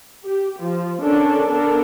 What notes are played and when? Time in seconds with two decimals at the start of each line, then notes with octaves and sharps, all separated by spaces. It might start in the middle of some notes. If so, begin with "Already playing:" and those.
0.24 G4
0.60 F3
1.02 C#4 D4 A4 A#4
1.48 B3 D4 A4 A#4